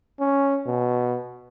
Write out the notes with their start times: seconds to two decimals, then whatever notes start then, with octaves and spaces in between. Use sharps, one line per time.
0.20 C#4
0.66 B2